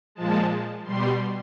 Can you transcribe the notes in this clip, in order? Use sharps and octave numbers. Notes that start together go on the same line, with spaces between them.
A#2 F3 G#3 A5
B2 G3 C6